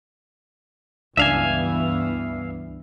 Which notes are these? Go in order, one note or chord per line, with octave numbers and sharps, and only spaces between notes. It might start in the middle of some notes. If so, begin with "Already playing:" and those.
C#2 G2 E3 B3 D4 E5 F5 G#5